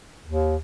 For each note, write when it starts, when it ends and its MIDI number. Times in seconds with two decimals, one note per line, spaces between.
0.25 0.57 39